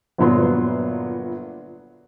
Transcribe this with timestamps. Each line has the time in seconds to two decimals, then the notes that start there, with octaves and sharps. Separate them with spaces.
0.18 G1 A#2 F#3 B3 C6